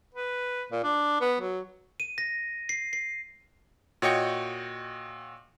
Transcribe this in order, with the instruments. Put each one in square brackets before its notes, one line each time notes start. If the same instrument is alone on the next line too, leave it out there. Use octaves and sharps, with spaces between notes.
[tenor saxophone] B4
A#2
D4
B3
F#3
[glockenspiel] D#7
A#6
C7
C7
[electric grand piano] A#2 F#4 C#5 D#5 G5 C#7